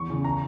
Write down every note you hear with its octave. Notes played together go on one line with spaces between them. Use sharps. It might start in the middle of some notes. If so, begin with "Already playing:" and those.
Already playing: E2 C#6
C#3 E3
A#5